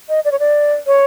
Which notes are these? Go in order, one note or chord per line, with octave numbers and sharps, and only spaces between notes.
D#5
D5
C#5
D5
C#5